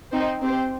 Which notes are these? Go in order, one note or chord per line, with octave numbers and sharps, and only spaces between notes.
C4 D#4 C5
C4 G4 C5